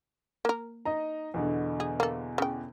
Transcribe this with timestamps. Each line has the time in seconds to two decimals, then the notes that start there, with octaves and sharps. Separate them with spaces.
0.45 A#3 A#4
0.85 D#4 D#5 A#5
1.34 E2 B2 D3
1.80 G#4
2.00 A#3 A4
2.38 C#3 G5